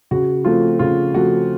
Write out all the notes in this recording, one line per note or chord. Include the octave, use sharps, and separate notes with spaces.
C#3 F#4
F3 A3 C4 F4
C#3 F4
F3 A3 C4 F#4